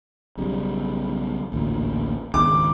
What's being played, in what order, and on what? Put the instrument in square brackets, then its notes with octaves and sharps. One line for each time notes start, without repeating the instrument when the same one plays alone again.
[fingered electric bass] B1 C#3 G3
A1 D2 A#2
[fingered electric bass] C#2 G#2 D#3 [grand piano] D6